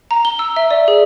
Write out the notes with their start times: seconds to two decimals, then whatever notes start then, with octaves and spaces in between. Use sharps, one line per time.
0.11 A#5
0.25 G7
0.39 E6
0.56 E5
0.71 D5
0.88 G#4